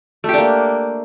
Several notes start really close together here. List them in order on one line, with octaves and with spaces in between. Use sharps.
A3 G4 D4 A#3